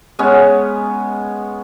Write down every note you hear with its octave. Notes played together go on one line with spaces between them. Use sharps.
G#3 B3 C#4